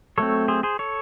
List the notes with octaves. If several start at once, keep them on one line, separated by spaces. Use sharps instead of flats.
F#3 A3 C4 A4 C#5
G#4 C5
G#4 C5
A4 C#5